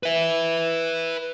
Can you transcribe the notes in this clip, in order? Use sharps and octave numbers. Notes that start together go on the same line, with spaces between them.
B4 E5